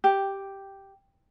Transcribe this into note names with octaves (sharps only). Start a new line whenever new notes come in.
G4